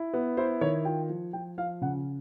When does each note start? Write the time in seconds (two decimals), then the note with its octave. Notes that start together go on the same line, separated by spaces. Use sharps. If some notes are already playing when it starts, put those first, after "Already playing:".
Already playing: E4
0.14 B3
0.37 E4 C5
0.61 D#3 C#5
0.85 F4 G5
1.09 F3
1.33 F3 G5
1.58 F3 F5
1.81 C#3 F#5